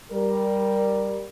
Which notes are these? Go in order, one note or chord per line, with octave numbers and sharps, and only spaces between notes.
G3 A#4